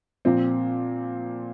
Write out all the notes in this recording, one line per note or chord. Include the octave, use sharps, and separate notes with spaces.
A#2 F3 C4